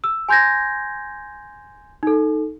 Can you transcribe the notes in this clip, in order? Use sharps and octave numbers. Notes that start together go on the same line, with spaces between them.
E6
G#5 C6 G6 G#6 A#6
D#4 A4